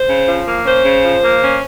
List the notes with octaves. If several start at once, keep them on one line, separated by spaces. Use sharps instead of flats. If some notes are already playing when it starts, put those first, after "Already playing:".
Already playing: C5
C#3
F3
A#3
C#4 C5
C#3
F3
A#3
C#4